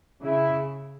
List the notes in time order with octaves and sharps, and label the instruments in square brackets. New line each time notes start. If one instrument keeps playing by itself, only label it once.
[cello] C#3 [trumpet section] E4